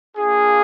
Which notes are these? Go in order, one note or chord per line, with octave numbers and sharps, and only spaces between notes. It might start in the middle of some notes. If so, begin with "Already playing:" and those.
A#3 D4 F4 G#4